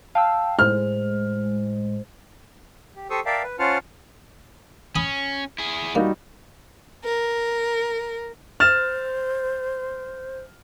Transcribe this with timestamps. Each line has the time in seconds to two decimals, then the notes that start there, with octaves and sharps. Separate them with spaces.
0.15 F5 G5 A5 E6
0.59 A2 G#3 C5 F6
2.96 G4
3.10 G4 A4 C5 C#6 D#6 E6
3.26 A#4 D5 E5 F5 G5 A5
3.43 B4
3.59 C#4 F4 C5 F#5 A5 F6
4.96 C#4 G#5 B5 D#6
5.58 E4 G#4
5.95 G3 A#3 D#4 F#4
7.04 A#4
8.60 C5 F6 A6 E7